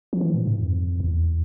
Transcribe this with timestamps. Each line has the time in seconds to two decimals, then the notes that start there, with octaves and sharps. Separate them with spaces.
0.13 F3
0.21 E3
0.34 A#2
0.47 G#2
0.61 F2
1.00 E2